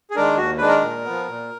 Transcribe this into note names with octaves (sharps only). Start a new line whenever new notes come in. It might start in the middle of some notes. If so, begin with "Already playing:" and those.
G#4
D#3 G#3 D4 A#4
D#2 F#4
D#3 G#3 D4 B4
A#4
A#2
F3 B3
A#2